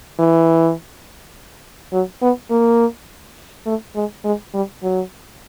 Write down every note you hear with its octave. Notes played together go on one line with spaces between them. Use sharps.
E3
F#3
B3
A#3
A3
G#3
G#3
G3
F#3